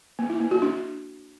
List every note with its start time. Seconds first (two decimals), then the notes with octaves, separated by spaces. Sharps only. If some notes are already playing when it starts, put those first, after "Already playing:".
0.19 A#3
0.30 E4
0.40 A#3
0.51 F#4
0.62 D4